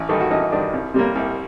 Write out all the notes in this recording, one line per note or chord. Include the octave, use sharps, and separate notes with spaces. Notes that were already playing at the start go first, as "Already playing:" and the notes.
Already playing: A1
G2 D#3 A4
F#4
A1 D#4
D#4
G2 D#3 D4
C2
C3 G3 A#3
C2